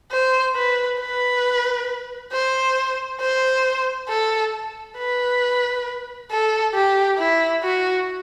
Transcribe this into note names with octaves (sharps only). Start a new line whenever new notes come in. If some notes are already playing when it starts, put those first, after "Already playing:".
C5
B4
B4
C5
C5
A4
B4
A4
G4
E4
F#4